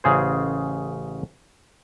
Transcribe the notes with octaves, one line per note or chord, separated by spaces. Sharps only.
A1 C#3 G#4 C5